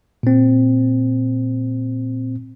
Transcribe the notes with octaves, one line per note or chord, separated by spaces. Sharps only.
A#2 C4